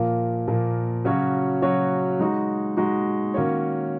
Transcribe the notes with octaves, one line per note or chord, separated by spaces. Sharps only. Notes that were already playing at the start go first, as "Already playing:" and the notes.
Already playing: A#2 F3 A#3
A#2 F3 A#3
C#3 F#3 C#4 F#4 C#5
C#3 F#3 C#4 F#4 C#5
G#3 D#4 F#4
G#3 D#4 F#4
D#3 A#3 C#4 F#4 C#5